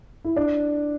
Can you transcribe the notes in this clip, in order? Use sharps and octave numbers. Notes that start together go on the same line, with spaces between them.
E4
D4